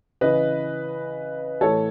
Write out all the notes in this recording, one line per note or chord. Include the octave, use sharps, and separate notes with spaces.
C#3 E3 B4 D#5
A2 E3 A4 C#5